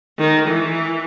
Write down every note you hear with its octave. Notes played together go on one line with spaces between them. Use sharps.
D#3
E3